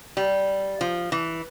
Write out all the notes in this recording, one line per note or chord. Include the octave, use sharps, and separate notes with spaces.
G3
F3
E3